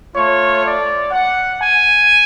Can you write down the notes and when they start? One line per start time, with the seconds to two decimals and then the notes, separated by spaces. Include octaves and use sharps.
0.15 A3 F4 C#5
0.64 D5
1.12 F#5
1.61 G#5